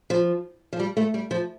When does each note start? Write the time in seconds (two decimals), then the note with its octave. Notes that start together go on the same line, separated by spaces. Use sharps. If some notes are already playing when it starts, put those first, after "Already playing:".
0.10 F3
0.73 F3
0.79 G3
0.97 A3
1.14 G3
1.31 F3